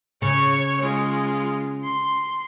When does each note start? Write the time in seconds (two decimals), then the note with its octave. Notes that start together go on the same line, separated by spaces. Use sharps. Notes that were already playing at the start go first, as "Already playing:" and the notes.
0.22 C#3 C#5 C#6
0.82 G#3 F4
1.84 C6